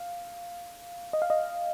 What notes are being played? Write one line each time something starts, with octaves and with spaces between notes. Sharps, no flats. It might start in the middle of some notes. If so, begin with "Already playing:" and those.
Already playing: F5
D#5
F5
D#5